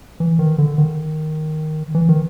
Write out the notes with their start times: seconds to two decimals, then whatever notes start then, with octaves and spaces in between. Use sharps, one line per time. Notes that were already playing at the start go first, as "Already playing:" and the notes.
0.20 E3
0.39 D#3
0.58 D3
0.78 D#3
1.95 E3
2.09 D#3